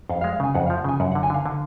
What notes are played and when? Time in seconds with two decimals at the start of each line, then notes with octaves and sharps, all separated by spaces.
0.09 F2 F5
0.21 F5
0.24 G#3
0.32 F5
0.40 C#3 G#5
0.54 F2 F#5
0.66 F3 F5
0.77 F#5
0.84 C#3 G#5
1.00 F#2 F#5
1.11 D3 F#5
1.23 G#5
1.30 D3 F5
1.46 D3